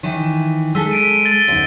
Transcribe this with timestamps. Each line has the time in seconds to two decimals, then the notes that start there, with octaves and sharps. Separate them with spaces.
0.03 D#3 E3
0.75 G#3 A4 E6 B6
0.91 B6 D7 D#7
1.25 A6 G7
1.48 D2 D#4